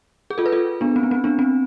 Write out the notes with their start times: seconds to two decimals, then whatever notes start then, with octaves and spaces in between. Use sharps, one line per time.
0.30 G#4
0.38 F4 A4
0.46 B4
0.52 F4 A4
0.81 B3 D4
0.96 C4
1.03 B3
1.11 C4
1.24 B3 D4
1.39 C4